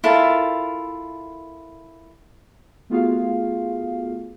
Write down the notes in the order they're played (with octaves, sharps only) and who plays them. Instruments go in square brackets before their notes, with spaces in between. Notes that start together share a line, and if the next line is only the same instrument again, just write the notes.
[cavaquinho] E4 F4 A4 A#4
[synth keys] A3 B3 F4 F#4 G#4 F5